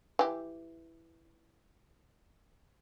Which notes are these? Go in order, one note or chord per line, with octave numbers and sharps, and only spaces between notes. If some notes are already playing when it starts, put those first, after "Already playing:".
E3 G4